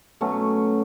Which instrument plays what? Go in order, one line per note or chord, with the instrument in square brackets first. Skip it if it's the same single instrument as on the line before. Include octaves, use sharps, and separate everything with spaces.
[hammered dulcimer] B2 F#3 A3 C#4